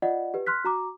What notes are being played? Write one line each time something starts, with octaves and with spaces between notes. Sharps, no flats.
F4 D5 D#5 F#5
G4 B4
C6 F6 F#6 B6
F#4 A#5 D6